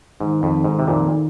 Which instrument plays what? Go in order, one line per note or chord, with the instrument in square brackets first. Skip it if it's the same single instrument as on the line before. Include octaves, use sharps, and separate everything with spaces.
[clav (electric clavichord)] G#2 [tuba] D#3
[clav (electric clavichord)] F2
G#2
C3
F2 A#2